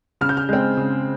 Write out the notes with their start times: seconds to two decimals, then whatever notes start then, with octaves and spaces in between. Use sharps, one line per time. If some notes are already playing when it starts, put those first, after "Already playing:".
0.21 C#3 F6
0.29 G6
0.37 F6
0.49 G#3 C4
0.77 C#3